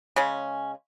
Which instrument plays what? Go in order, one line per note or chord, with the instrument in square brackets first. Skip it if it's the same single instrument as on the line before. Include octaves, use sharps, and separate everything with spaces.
[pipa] C#3 G#3 C#4